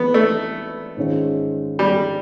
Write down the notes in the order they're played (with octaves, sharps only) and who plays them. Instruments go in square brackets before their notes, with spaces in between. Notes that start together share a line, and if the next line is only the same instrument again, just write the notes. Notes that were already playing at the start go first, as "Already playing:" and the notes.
Already playing: [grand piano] E3 G#3 C4 [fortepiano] B3
[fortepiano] A3
[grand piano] G#2 D#3 G#3 C#4 F4
[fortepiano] G3